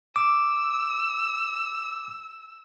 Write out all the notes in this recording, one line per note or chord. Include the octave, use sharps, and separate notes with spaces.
D6 E6